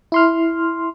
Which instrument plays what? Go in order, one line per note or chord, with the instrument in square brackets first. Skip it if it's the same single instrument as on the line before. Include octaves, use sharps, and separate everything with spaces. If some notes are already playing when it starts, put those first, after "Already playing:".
[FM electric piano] E4 C6 F6